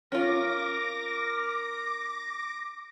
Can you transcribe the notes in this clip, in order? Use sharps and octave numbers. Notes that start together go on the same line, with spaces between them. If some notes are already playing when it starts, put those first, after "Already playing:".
C#4 F4 A#4 D6 A#6